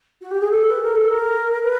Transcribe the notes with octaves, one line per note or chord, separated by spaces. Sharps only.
F#4
G4
G#4
A4
B4
A#4
A4
A#4
B4